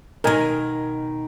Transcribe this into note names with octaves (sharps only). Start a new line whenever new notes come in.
B2 D#3 A#4 D#5 G#5